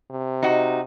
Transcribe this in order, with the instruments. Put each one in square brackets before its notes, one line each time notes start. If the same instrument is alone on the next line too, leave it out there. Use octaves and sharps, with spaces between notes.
[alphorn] C3
[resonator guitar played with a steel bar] D#4 F#4